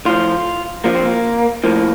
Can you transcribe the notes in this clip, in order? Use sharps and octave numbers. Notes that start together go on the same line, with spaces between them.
A2 F3 F4
A#2 F3 A#3
C4
A#3
A2 F3 A#3